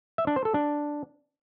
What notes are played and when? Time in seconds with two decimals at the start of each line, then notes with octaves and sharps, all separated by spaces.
0.18 E5
0.27 D4
0.36 C5
0.45 A4
0.54 D4